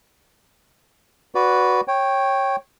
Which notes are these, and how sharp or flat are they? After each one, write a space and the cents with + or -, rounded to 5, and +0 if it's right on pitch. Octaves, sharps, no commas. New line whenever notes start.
F#4 +0 B4 +0 D5 -20
C#5 -15 G5 +0